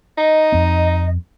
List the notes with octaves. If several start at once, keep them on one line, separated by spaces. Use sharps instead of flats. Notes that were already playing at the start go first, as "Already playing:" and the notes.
D#4 D#5
F2 C4